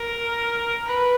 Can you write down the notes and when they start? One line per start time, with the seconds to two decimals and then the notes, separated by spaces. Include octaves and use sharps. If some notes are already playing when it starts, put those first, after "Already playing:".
Already playing: A#4
0.86 B4